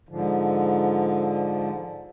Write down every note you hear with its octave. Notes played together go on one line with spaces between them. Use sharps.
G#2 D3 F3